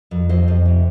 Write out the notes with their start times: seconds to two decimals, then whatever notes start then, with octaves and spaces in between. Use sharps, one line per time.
0.11 F2
0.29 F2 C5 D#5
0.48 F2
0.65 C3